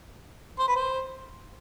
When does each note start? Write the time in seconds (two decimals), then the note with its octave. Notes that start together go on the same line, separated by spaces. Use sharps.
0.59 C5
0.68 B4
0.76 C5